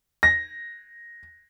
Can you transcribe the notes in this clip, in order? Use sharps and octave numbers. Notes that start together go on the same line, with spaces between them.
A#6